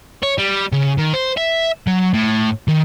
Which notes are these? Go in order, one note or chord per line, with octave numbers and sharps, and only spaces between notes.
C#5
G3
C#3
D#3
C5
E5
F#3
A2
D#3